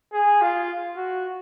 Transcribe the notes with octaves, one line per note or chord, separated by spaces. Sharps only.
G#4
F4
F#4